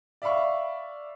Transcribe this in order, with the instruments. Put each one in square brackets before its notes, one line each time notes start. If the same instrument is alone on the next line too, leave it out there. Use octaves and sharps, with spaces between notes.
[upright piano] D5 E5 F5 B5 C#6